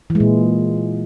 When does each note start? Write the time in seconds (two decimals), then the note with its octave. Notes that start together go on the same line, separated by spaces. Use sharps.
0.10 E3
0.15 G#3
0.20 A#2